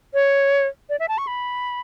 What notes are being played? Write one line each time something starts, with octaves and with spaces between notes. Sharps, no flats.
C#5
D5
E5
A5
C#6
B5